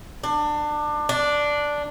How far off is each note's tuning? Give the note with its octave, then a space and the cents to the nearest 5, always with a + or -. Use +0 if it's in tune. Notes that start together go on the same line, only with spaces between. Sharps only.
D4 +25
D4 +0